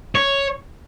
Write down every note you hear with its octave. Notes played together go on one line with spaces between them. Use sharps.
C#5